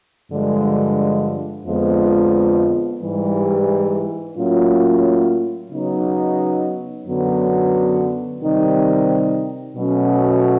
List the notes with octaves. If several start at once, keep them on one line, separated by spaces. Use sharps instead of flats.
G2 D3 F3 G#3
F2 D3 F3 G#3 B3
G#2 E3 G3
A2 F#3 A#3 C#4 F4
C#3 F#3 B3 D#4
F#2 D3 F#3 B3
C3 D#3 G3 C4 D#4
B2 F#3 A3 C#4